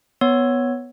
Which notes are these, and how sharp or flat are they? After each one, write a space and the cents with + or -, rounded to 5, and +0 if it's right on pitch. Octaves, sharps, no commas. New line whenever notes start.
B3 +0 C#5 +0